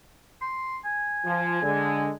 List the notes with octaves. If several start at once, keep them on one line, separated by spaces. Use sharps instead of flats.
C6
G#5
F3
D3 G#3